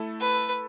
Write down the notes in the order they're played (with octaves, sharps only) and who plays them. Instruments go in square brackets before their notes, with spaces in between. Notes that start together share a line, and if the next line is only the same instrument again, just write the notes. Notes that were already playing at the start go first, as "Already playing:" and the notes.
Already playing: [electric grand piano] A3 E4 A4
[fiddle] B4